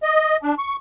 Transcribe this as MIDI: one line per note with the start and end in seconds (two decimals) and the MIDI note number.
0.03 0.37 75
0.43 0.55 62
0.58 0.76 85